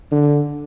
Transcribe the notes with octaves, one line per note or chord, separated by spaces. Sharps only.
D3